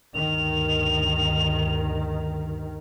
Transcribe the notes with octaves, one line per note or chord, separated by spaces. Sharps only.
D2 G2 D#3 F7